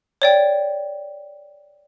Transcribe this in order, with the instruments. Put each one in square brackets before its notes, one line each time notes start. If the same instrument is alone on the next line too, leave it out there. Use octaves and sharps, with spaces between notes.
[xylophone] C#5 D5 G5